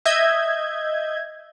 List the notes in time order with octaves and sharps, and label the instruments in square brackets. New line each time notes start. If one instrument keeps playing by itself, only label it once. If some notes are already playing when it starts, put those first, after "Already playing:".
[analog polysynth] D#5 E5 G6 G#6